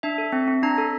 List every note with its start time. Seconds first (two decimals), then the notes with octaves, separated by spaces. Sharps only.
0.03 D4 E5
0.18 A4
0.32 C4
0.48 C4
0.63 D4 A#5
0.78 A4